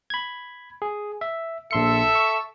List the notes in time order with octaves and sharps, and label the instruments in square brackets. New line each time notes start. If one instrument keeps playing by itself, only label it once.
[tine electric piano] B5 G#6
G#4
E5
[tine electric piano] A#1 C6 C#7 [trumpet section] A4 E5
[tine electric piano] C#6